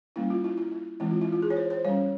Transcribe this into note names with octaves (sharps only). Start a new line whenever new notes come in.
G3 A#3 C#4 E4
F4
E4
E4
E4
E3 G#3 C4 E4
F4
E4
F4
G#4
C#5
C5
C5
G3 C#4 C#5